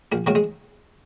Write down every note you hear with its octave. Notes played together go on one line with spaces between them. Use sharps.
A#1 A#3
G#2 D#3 F#3 A#3
G#3